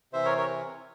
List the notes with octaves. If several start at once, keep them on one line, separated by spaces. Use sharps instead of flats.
C3 E3 C5 E5
A#4 C#5
A#4 C#5